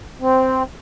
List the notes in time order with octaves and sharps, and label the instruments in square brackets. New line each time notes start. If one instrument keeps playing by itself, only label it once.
[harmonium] C4